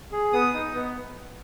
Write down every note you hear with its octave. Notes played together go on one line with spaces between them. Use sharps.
G#4
B3 D#6
D#4
B3